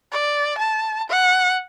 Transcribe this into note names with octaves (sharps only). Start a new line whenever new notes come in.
D5
A5
F#5